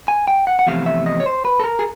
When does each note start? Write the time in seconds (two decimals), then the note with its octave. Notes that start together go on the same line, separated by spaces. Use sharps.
0.08 G#5
0.28 G5
0.47 F#5
0.59 F#5
0.67 E2 C3 F3 A3 F5
0.86 E5
1.06 D#5
1.20 C#5
1.26 C5
1.45 B4
1.60 A4
1.64 A#4
1.79 G#4